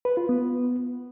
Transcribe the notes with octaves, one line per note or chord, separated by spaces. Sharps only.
B4
F4
B3